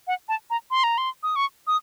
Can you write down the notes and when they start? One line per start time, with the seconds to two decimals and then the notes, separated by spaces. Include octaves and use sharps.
0.07 F#5
0.29 A5
0.50 A#5
0.71 C6
0.84 A#5
0.98 C6
1.23 D#6
1.36 C#6
1.67 D#6